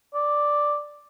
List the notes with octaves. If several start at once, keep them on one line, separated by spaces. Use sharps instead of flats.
D5